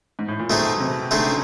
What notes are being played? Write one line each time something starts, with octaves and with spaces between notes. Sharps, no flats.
G#2
A2
A#2
B2 A3 C4 D#4 G#4 C5
C3
D3 A3 C4 D#4 G#4 C5
C#3